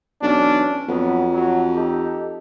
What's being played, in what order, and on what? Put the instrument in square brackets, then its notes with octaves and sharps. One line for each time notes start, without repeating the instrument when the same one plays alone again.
[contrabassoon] B1 [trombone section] E3 C#4 D4
[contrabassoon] F2 [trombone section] F#3 B3
[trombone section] F#3
D#4 G4 A4